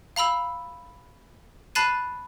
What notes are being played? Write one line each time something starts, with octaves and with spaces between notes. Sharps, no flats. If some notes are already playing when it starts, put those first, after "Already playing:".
F5 A#5 B5 E6
A5 B5 F#6 A6 C7 D#7